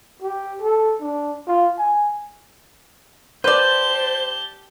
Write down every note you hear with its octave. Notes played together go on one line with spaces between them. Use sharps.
G4
A4
D4
F4
G#5
G4 B4 C5 D5 A5 G7